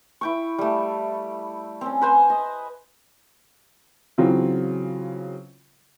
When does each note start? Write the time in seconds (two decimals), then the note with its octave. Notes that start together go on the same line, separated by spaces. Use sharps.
0.21 E4 G5 C#6
0.58 G3 A3
1.81 C4 C#4
2.01 B4 C5 G#5
2.30 D#5
4.18 C#3 E3 F#3 C4 F4